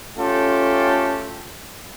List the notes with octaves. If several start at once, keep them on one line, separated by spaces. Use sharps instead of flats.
A3 C#4 F4 G4 A4